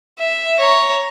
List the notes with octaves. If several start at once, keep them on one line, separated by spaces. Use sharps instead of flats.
E5
C#5 A#5